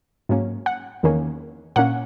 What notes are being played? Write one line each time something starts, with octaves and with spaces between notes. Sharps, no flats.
G#2 F#3 A#3 C#4
F#5
E2 D#3 A#3 C#4
A#2 A#3 C#4 F#5